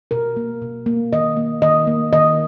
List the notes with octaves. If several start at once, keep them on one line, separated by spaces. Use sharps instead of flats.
B2 A#4
A#3
B2
A#3
D#3 D#5
A#3
D#3 D#5
A#3
D#3 D#5